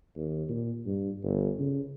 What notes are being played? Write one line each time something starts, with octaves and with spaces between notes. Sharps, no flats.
D#2
A#2
G2
G1
C#3